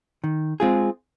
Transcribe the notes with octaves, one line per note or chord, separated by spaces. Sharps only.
D#3
G#3 C4 F4 G#4